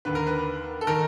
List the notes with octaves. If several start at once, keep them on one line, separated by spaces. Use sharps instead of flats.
D#2 D3 B4
A#4
B4
A4
D#3 A#4